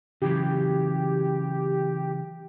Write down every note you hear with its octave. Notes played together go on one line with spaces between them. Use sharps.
C#3 E3 F#3 G4